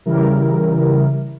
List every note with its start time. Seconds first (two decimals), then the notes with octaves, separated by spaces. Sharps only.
0.06 C#3 E3 G3 E4 A#4